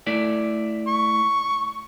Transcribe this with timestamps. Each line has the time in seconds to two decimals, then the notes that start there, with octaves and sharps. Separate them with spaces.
0.07 A3 E4 D5
0.87 C#6